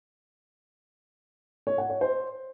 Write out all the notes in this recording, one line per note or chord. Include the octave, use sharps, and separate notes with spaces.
C#5
F#5
C#5
C5